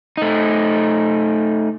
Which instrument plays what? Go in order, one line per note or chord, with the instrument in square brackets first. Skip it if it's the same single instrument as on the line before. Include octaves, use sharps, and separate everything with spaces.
[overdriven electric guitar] A3 D#4